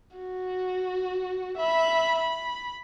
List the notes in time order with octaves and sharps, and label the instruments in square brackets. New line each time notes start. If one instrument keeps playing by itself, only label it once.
[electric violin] F#4
E5 B5
B5